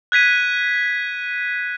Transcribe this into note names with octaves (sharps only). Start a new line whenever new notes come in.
F#6 G#6 B6 D#7